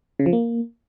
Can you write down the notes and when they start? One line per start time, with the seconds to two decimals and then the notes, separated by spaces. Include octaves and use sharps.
0.19 C#3
0.26 F3
0.33 A#3